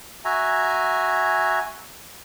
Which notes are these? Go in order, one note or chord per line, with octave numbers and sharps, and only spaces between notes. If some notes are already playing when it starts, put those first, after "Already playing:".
F#4 E5 G#5 A#5